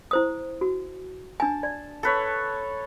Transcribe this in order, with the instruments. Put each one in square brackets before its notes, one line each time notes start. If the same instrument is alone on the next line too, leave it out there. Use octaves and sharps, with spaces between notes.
[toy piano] E4 C5 D#6
F#4
[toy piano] D4 G#5 [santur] A5
[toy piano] D5
[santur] A4 B4 C#5